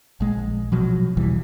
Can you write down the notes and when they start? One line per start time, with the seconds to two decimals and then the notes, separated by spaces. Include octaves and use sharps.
0.20 A#1 G#3
0.72 B2 F3 F#3
1.17 E1 B1 E3 G3